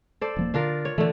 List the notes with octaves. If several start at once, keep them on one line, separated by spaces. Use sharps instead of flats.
A4 C5 D5
D#1 F3 A#3
D3 D4 F4 A#4
C#5
D3 E3 A3